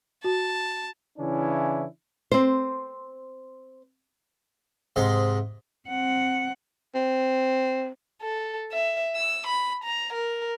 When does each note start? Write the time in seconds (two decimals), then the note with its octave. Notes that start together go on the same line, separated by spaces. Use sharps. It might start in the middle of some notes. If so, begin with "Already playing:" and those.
0.24 F#4 A5
1.18 C#3 E3 C#4 D4 E4
2.32 C4 C5
4.96 G#2 C3 D#5
5.89 C4 F#5
6.95 C4
8.22 A4
8.72 E5
9.15 E6
9.47 B5
9.84 A#5
10.13 A#4